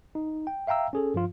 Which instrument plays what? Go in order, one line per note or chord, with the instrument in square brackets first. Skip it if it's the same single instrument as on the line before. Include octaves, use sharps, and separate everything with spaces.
[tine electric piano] D#4
G5
E5 F5 G5 A#5 E6
C#4 G#4 A4
G2 F3 F4